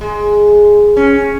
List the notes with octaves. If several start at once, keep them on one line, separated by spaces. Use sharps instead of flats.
G#3
C#4